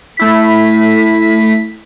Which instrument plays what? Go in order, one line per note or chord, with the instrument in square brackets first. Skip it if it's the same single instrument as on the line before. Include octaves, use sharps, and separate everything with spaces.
[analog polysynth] A3 E4 B6